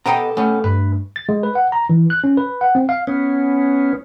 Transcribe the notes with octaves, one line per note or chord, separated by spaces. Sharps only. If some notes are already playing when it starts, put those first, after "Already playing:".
B2 B3 G4 A4 D#5 G5 A#5
A3 B3 C#4
G2 B4
A6
G#3
B4
F#5
A#5
E3
F#6
C#4
B4
F#5
C4
F5
B3 C#4